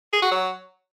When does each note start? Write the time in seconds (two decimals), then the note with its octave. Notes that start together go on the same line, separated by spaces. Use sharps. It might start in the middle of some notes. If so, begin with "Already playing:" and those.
0.13 G#4
0.22 F#4
0.31 F#3